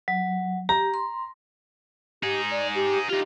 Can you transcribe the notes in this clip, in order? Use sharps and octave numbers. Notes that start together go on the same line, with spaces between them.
F#3
G4 A#5
C6
D#4 G4 G#4
D5
G4
D#4 F4 G4